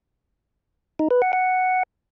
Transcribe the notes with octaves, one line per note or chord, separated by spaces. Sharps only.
D#4
B4
F#5
F#5